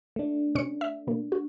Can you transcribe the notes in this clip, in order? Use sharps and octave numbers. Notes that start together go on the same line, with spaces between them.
A3 D4
C3 C#4 C#7
E5
B2 A#3
F#4